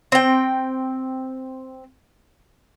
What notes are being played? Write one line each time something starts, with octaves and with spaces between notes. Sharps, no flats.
C4 G5